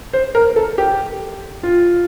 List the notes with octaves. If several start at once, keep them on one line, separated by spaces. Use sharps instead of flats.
C5
A#4
A4
G4
F4